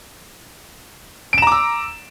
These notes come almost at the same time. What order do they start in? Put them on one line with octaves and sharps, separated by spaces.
D7 E7 A#5 D6 E6